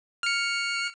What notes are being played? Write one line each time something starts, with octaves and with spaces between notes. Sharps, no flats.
F6 C#7